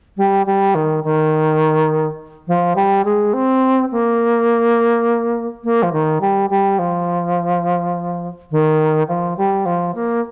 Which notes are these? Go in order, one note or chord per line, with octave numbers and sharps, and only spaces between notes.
G3
G3
D#3
D#3
F3
G3
G#3
C4
A#3
A#3
F3
D#3
G3
G3
F3
D#3
F3
G3
F3
A#3